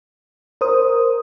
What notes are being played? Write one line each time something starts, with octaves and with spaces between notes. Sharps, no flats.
A#4 C5 D#6